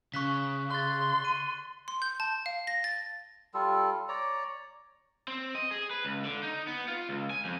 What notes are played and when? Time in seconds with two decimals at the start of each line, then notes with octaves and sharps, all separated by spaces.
0.14 C#3 C#6 F#6 B6
0.71 C6 F#6 A6
1.25 D#7
1.88 C6
2.02 G6
2.20 A5
2.46 F5
2.67 A#6
2.84 A6
3.54 G3 F4 A4
4.09 C#5 D5 A#5
5.28 C4
5.55 D#5
5.71 G#4
5.90 B4
6.05 C#2
6.24 D3
6.43 D#4
6.67 B3
6.88 F4
7.09 C#2
7.30 G#5
7.45 F2